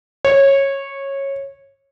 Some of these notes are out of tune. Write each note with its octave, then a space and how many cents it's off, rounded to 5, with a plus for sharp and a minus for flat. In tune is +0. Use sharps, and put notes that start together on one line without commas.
C#5 -15